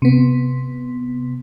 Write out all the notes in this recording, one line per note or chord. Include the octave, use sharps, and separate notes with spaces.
C3 B3